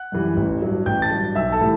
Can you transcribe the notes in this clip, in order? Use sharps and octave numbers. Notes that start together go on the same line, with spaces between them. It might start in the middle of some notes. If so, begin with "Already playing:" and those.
Already playing: F#5 F#6
F#2 E3 G3
A1
G2 F#3
A1 G5 G6
A5 A6
G2 F#3
B1 E5 E6
A4 A5
A2 E3 G3